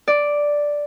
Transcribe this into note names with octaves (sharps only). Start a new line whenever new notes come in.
D5